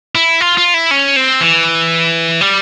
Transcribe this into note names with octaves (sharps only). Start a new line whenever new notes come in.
E4
F4
F4
E4
C#4
C4
E3
G3